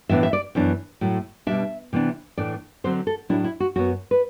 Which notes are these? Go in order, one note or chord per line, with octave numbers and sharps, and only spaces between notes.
A2 E3 B3 D4 E5
E5
D5
F#2 E3 B3 D4
A2 F#3 A3
B2 G3 D4 E5
C3 E3 B3 D4
A2 E3 A3 D4 D5
D3 F#3 C4 C5
A4
A2 F#3 A3 D4 E4
E4
F#4
F#2 F#3 B3 F#4
B4